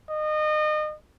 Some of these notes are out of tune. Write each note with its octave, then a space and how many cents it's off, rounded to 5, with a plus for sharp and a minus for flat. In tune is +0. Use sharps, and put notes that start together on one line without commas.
D#5 -30